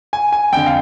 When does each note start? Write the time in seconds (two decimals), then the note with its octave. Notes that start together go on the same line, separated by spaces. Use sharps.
0.13 G#5
0.32 G#5
0.52 F2 D3 G5
0.66 F5